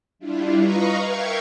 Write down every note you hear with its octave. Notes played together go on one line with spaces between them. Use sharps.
G3 D4 E4 F4
B4 D#5 F5 A#5 B5 C#6
A#4 E5 F5 G5 C#6 G#6